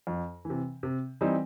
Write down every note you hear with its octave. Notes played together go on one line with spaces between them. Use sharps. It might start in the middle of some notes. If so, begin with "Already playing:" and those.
F2
E3
C3
C3
E3 G3 C4 D#4